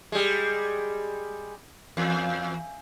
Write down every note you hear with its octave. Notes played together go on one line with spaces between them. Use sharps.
G3 G#3
E2